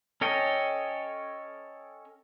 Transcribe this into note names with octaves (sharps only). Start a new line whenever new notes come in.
C#4 A4 C#5 D#5 G5